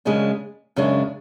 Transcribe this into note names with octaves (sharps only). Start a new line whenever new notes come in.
F#2 C#3 G#3 D4
F#2 C#3 G#3 D4